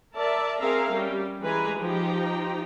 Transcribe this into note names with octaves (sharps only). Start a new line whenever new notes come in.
A#4 D5 E5 A5
C4 G#4 A#4 E5 F5 A#5
G3 C#4 G4
E3 G#3 G#4 B4 G#5 A#5
F3 D#4 G4 G5 A#5